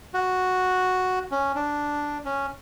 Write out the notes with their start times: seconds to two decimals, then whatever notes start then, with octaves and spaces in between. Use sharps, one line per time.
0.14 F#4
1.31 C#4
1.55 D4
2.25 C#4